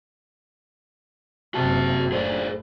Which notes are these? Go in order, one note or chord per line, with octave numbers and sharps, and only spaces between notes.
F#1 C3 F#4 A5
A2 G#4 C5 D5